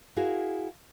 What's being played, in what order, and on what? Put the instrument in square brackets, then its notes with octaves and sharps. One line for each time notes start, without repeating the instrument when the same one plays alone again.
[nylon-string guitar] E4 F#4 G#4 A#4 F5